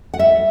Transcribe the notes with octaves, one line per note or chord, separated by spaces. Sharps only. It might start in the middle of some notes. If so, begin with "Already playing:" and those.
F#5
G3 E5